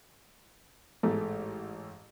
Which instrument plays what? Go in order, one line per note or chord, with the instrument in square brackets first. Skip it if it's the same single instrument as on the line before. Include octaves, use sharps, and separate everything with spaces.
[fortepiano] A1 G#2 A3